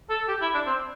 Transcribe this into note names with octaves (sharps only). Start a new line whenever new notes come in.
A4
G4
E4
D4
C4